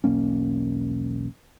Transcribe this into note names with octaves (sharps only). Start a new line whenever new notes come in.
E1 B1 A#3 C#4